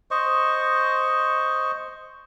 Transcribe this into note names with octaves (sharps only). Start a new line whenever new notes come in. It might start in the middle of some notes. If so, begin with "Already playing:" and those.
C5 D#5 C#6